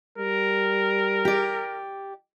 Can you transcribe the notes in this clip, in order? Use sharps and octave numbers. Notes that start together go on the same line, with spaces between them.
G3 A#4
G4 D5